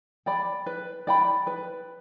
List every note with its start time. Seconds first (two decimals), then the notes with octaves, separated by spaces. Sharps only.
0.26 D5 G5 B5
0.66 B4
1.07 D5 G5 B5
1.47 B4